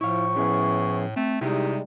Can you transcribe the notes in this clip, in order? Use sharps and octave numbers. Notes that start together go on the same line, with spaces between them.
A2 F3 E4 F5 C#6
F3 B3 C#4 E4 G#4 C5
A3 C4
C3 G3 G#3 D#4 E4 G4 G#4